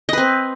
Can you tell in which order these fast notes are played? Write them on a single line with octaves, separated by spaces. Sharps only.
D#5 B4 C4